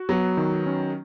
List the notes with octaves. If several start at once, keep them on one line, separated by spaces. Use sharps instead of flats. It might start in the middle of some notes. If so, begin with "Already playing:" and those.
Already playing: F#4
F#3 B3
D#3
C#4